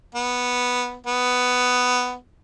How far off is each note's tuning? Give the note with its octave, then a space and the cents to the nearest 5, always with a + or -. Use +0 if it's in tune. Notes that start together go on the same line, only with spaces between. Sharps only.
B3 -5
B3 +10